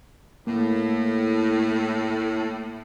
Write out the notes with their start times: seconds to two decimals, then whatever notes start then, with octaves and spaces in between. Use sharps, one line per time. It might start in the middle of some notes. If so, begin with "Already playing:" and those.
0.47 A2 A#3